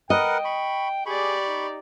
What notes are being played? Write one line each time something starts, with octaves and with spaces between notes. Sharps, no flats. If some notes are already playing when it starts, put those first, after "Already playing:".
A#4 B4 D#5 F#5 G5
B5 C#6
G4 G#4 D5 B5 C#6
D#4